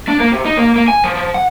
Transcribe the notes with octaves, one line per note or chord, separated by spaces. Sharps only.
D4
A#3
C3
D#4
A#3
A#3
G#5
F3
F3
F#5